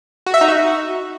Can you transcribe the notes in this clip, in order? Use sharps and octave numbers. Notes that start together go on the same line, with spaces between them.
F#4
E5
D#4
F#4